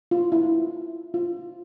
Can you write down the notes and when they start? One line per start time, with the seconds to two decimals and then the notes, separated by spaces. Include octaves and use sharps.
0.11 F4
0.32 E4
1.14 F4